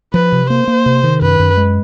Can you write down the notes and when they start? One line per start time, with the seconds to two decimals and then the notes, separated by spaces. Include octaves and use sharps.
0.13 F3 B4
0.32 C3
0.50 A#3 C5
0.68 A#3
0.86 C3
1.04 D#3
1.21 F#2 B4
1.39 F#2
1.57 G#3